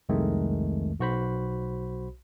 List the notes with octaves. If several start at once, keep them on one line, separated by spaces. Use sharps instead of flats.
C2 F2 D#3 G#3 A3
B1 F#4 C5 B5